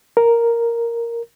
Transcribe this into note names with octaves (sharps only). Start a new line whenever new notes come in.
A#4